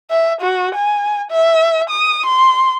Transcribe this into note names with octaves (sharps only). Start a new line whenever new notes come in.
E5
F#4
G#5
E5
D#6
C6